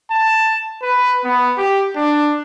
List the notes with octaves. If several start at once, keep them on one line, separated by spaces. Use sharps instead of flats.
A5
B4
B3
G4
D4